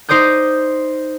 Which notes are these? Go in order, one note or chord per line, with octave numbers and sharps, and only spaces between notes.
D#4 C5 D5 D#6 G6